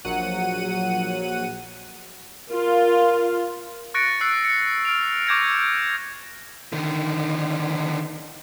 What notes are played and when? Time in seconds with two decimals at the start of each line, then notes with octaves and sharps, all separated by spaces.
0.05 A#1 F#3 F#5 D#7
2.50 F4 A#4
3.94 C#6 F#6 A6 A#6 C#7 D7
4.21 E6 F#6 C7
4.44 C#7
4.85 F6 D7 F7
5.27 C#6 D6 G6 G#6 A#6 D7
6.72 D3 D#3